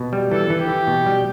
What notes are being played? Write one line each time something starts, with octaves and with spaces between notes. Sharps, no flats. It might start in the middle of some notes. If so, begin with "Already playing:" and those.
Already playing: B2
G3
E3 A4
E3
G4
E3
B2
G3